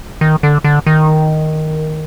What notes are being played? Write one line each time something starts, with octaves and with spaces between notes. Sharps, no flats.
D#3
D3
D3
D#3